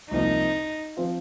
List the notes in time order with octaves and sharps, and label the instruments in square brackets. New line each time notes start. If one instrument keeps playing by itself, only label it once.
[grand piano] C2 C3 F3 A#3 [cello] D#4
[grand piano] F3 C4 F4